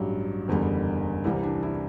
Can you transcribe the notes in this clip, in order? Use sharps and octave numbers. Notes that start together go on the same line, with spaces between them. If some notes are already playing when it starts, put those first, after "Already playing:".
Already playing: A1 G2 F#3 G4
F#1 E2 D3 G3
C2 C3 E3 G3 E4
D4
E4